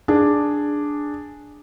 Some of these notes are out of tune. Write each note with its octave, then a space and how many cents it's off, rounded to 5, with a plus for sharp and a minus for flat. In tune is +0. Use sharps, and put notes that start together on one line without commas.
D4 +0 G#4 +0